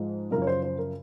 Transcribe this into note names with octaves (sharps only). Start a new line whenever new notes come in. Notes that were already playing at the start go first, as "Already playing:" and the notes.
Already playing: G#2 F3 G#3
F#2 C#3 F3 A#4
C#5
C5
C5
A#4